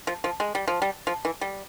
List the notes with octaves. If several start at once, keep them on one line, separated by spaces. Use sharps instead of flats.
F3
F3
G#3
G3
F3
G3
F3
E3
G3